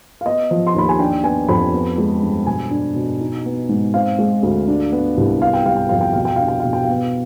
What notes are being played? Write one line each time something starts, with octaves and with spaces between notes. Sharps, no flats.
F5
B3 D#5
F3
C6
D#2 B5
G#5
D4 G5
B3 G#5
F2 B5
B3
G#3
G2
B2 G#5
D4
B2
D#4
B3
G#2
C4 F5
G#3
D2
D4
B3
C2
B3 F5
G5
G3 F5
G5
F2 F5
G5
B2 F5
G5
D4 F5
G5
B2 F5
G5
B3 F5